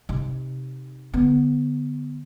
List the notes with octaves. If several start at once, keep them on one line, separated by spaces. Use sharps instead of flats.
C3 D#4
D3 B3